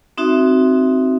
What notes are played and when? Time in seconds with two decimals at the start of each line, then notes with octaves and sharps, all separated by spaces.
0.18 C4 D#4 F#4 E5